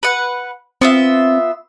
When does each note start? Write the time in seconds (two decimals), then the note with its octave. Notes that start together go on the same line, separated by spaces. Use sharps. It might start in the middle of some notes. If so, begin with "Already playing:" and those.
0.03 B4 F#5
0.81 B3 C4 F4 E5